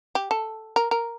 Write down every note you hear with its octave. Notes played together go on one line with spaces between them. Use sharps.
G4
A4
A#4
A#4